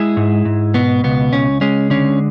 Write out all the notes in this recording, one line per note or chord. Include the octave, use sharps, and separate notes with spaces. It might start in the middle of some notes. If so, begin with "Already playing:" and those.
Already playing: G#3 E4 G#4
G#2
G#2
B2 B3
C#2 B3
C#2 C#4
G#3 C#4
D3 C#4